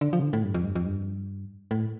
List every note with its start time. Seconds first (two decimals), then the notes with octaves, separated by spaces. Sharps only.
0.01 D3
0.13 F3
0.19 C3
0.22 D3
0.33 A2
0.44 G2
0.54 F2
0.65 G2
0.75 F2
0.86 G2
1.71 A2